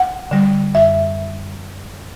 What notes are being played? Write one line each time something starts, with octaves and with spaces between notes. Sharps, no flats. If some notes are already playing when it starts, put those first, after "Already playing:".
Already playing: F#5
D3 G3
F#2 E5